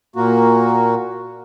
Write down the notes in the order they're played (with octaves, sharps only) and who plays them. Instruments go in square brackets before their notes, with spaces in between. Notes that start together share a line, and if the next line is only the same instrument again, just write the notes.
[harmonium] A#2 A#3 F#4